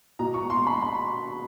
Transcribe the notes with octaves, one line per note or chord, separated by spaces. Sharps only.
B2 A#5
C#6
C6
B5
B5